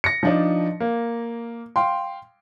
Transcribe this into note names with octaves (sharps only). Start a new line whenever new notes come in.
A#6 C#7
F3 D4 D#4
A#3
F5 G5 C6